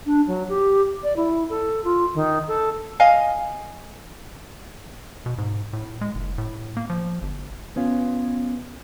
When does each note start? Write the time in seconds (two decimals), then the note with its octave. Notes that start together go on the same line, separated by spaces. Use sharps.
0.06 D4
0.27 F#3
0.49 G4
1.03 D5
1.16 E4
1.50 A4
1.84 F4
2.14 D#3
2.48 A4
3.00 D#5 F5 G#5
5.26 B2
5.38 G#2
5.73 A2
6.01 G#3
6.15 F#1
6.38 A2
6.77 A#3
6.90 F3
7.22 G1
7.76 B3 C#4 F4